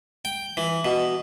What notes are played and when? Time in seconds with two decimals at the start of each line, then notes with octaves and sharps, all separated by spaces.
0.25 G5
0.57 E3
0.85 B2